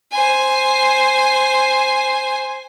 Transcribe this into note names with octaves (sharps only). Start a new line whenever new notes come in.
C5 G#5